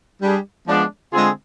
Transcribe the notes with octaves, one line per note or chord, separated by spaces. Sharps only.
G3 D4 G#4
F3 G#3 B3 D4
D3 G#3 C4 F4 G#4